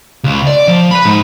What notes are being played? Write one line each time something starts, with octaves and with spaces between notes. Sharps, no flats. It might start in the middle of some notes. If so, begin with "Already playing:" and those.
C#2
D5
F3
B4 B5
G#2